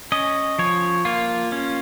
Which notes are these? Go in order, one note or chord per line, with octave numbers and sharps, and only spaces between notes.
C#4 D#5
F3 C#5
A#3 F4
C#4